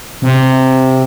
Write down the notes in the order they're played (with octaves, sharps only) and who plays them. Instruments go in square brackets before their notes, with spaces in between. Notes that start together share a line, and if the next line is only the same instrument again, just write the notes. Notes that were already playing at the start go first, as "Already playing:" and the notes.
[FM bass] C3